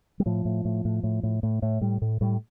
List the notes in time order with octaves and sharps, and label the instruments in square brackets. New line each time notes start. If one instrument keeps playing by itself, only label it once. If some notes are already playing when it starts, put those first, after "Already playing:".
[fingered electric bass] G3
A2 F3
A2
A2
A2
A2
A2
A2
A2
A2 G3
A2
A2 G3